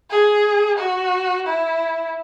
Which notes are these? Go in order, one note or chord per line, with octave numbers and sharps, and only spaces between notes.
G#4
F#4
E4